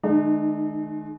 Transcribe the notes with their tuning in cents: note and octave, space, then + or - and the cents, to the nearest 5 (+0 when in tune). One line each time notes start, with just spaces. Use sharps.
D#3 -10 G#3 +40 D#4 -45